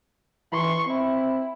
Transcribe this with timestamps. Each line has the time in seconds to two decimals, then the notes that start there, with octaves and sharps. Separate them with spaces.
0.52 E3 C6 C#6
0.87 C4 E4